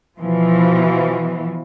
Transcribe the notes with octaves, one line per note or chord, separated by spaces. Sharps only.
B2 E3 F3